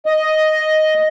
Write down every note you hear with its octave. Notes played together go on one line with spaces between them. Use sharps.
D#5